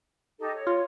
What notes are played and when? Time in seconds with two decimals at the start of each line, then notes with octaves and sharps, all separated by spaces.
0.39 D#4 G4 A4
0.53 C#5
0.67 F4